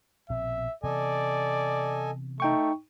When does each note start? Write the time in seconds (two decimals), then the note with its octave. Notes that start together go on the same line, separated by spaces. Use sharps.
0.30 A#1 B2 C4 E5
0.84 C3 E3 B3 A4 D5 D#5 G#5
2.40 A3 D#4 G5 C#6